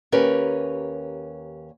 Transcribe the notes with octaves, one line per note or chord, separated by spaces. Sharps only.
D#2 C#4 G4 A#4 B4 C#5